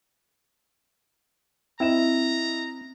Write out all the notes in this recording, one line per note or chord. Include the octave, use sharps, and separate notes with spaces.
C4 E4 D#5 A#5 E7